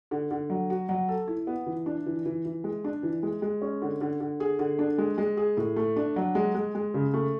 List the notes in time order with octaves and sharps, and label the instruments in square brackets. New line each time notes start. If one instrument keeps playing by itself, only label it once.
[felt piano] D3
D3
F#3
F#4
F#3
A4
E4
B3
E3
D4
E3
E3
E3
G#3
D4
E3
G#3
G#3
C#4
D3
D3
D3
G#4
D3
D4
G#3
G#3
G#4
A2
A3
D4
F#3
G#3
G#3
G#3
C#3
A3